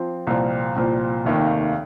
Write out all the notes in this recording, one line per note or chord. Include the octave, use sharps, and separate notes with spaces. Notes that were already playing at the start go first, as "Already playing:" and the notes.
Already playing: F3 C4
C2 A#2 F3 C4
C2 A#2 F3 C4
F1 D#2 D#3 A#3